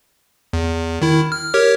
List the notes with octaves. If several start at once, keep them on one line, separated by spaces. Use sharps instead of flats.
E2
D#3 E4
F6
G4 A#4 C#5